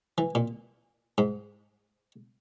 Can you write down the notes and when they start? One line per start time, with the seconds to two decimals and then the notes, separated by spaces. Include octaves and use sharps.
0.18 E3
0.35 A#2
1.18 G#2